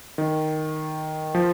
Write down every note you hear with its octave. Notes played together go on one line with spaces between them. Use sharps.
D#3
F3